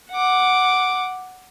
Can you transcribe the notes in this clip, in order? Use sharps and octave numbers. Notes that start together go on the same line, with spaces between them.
F#5 D6